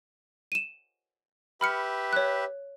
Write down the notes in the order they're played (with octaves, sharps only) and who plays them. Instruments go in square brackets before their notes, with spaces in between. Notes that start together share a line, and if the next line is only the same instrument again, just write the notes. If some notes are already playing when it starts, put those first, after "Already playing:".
[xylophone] D#7 E7
[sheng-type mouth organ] G4 B4 E5 [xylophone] B5 F6 C#7
[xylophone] C#5 F#6